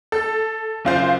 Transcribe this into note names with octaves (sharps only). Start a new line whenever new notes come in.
A4
F#1 F4 C5 G#5